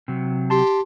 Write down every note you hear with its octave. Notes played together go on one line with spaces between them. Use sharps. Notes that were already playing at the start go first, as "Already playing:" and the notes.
C3 F#3
G4 A5 C6